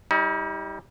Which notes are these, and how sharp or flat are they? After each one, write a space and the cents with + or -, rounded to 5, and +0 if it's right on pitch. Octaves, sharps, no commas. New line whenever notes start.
G3 +0 D#4 +40